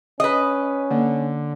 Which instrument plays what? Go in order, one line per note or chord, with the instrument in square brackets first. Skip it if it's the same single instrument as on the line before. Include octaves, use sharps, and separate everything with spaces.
[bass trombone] C#4 [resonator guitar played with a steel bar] B4 D#5
[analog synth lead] D3 [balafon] A#3